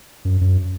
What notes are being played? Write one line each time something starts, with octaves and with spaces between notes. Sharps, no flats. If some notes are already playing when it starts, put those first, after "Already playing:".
F#2
F#2